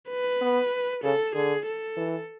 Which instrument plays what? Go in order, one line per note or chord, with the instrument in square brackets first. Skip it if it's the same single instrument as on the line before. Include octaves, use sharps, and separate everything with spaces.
[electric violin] B4
[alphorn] B3
[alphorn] C#3 [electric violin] A4
[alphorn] D3 [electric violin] G#4
[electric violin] A4
[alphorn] E3